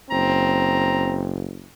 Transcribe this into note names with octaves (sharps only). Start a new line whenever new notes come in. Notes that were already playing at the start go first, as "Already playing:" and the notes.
F#1 C4 A#5